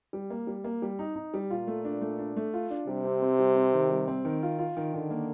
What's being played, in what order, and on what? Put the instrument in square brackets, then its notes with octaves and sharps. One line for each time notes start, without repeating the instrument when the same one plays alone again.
[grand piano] G3
A#3
G3
A#3
G3
D#4
D#4
G3
[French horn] A#2 [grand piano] F4
[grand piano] A3
D4
A3
D4
A3
F4
D4
[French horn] C3 [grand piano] G3
[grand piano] C4
C4
G3
C4
D#3
G3
C4
D#3
F4
F4
D#3
[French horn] D3 [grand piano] D#3
[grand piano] A#3